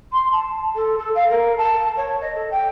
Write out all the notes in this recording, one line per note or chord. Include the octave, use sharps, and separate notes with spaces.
C6
A5
A4
A4
F5
A#4
A5
C#5
D#5
A4
G5